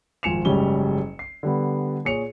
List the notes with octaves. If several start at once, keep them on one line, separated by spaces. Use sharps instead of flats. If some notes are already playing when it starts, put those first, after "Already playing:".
G#1 F3 G#5 C#7 E7 F7
F#1 G#2 G3 C#4 G7
C7
D3 G3 B3
A#2 G#4 C#5 C#7 F7